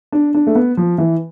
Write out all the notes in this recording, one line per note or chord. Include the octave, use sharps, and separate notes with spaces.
D4
D4
A3
B3
F3
E3